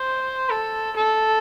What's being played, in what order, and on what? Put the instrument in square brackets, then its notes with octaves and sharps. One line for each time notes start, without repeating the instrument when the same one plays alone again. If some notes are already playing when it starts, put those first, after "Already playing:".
Already playing: [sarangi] C5
A4
A4